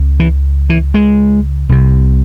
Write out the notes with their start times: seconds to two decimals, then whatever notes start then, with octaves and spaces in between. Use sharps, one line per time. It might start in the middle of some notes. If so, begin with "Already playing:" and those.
Already playing: C#2 C#3
0.20 E3
0.70 E3
0.94 G#3
1.69 C2 C3